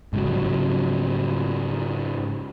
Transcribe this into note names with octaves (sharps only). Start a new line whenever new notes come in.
G#2 C#3 F#3